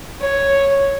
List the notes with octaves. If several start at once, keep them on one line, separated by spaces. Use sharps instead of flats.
C#5